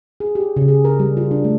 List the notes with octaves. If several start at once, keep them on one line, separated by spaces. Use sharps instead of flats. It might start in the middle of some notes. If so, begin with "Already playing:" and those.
G#4
G4
C#3
G#4
A#4
G3
F4
D4
A3